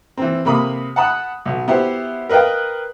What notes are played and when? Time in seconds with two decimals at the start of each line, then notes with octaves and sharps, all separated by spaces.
0.17 E3 C4
0.45 C3 A#3 B5 D6 D#6
0.96 F#5 A5 B5 D#6 F#6
1.45 B1
1.68 B3 E4 G4 C5
2.29 A#4 B4 D#5 F5 G5